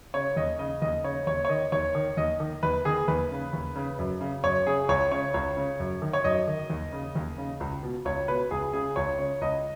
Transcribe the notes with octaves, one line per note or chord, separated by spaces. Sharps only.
C#3 C#5
D#2 D#5
C#3 D#5
D#2 D#5
C#3 C#5
D#2 C#5
C#5
D#3 D#5
D#2 C#5
D#3
D#2 D#5
D#3
D#2 B4
D#3 G#4
D#2 B4
C#3
D#2
C#3
F#2
C#3
F#2 C#5
C#3 G#4
C#2 C#5
C#3 C#5
C#2 C#5
C#3
F#2
D#3
C#5
F#2 D#5
D#3
D#2
C#3
D#2
C#3
C#2
B2
C#2 C#5
B2 B4
C#2 G#4
C#3 G#4
C#2 C#5
C#3 C#5
C#2 D#5